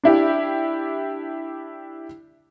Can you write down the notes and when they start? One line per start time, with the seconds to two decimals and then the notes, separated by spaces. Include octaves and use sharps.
0.04 D4 E4 G4